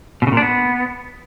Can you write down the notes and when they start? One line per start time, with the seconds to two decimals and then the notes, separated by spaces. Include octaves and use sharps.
0.22 B2
0.27 C#3
0.32 A#2
0.37 D4
0.42 B3